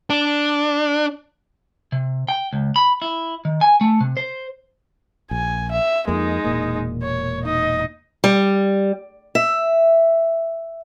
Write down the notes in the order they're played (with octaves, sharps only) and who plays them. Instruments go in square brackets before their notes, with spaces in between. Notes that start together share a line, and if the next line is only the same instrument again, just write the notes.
[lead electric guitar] D4
[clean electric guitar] C3
G5
C#2
B5
E4
D#3
G#5
A3
C3
C5
[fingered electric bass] A#1 [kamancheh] G#5
[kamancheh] E5
[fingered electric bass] F2 A#3 [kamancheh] G#3 D#4
[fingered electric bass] E1 A#2 A#3
[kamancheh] C#5
D#4 D#5
[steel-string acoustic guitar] G3
E5